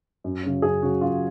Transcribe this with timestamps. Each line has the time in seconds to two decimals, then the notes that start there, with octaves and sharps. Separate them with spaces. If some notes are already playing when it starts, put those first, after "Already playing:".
0.24 F#2
0.43 C#3 F#3
0.62 F#2 G#4
0.82 C#3 F#3 F#4
1.01 F#2 F4